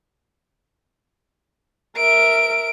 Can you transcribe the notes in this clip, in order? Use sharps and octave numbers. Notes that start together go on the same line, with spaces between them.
A#4 E5 D7